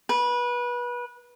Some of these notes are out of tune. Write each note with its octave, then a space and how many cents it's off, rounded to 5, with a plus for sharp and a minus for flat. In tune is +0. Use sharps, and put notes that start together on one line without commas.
B4 -25